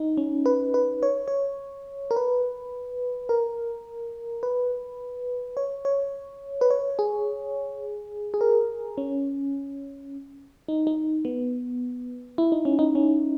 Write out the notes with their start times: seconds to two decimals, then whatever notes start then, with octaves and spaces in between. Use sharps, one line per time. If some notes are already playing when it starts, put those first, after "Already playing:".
Already playing: D#4
0.17 C#4
0.46 B4
0.74 B4
1.03 C#5
1.28 C#5
2.11 A#4
2.16 B4
3.29 A#4
4.43 B4
5.57 C#5
5.85 C#5
6.61 B4
6.70 C#5
6.99 G#4
8.34 G#4
8.41 A#4
8.98 C#4
10.68 D#4
10.87 D#4
11.25 B3
12.38 E4
12.52 D#4
12.65 C#4
12.79 D#4
12.95 C#4